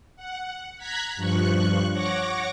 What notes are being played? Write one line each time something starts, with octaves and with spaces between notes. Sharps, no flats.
F#5
A#5 F#6 G#6 B6
G2 F3 C#6 F#6
C#5 F#5 C#6 D6 A#6